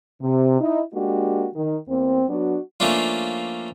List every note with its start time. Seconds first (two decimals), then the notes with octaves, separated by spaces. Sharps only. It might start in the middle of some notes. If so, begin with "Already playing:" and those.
0.22 C3
0.61 D#4 E4
0.94 G#3 A#3 D4 F#4 G4
1.56 D#3
1.88 E2 A#3 C4
2.29 F#3 B3 D4 F#4
2.80 F3 A3 A#3 C#4 D4 F4